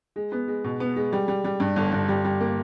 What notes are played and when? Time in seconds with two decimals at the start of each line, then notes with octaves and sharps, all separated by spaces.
0.16 G#3
0.32 B3
0.48 G#3
0.64 B2
0.80 B3
0.96 G#3
1.13 G3
1.28 G3
1.44 G3
1.60 G2
1.76 G1
1.92 G1
2.09 G3
2.24 G3
2.40 A#3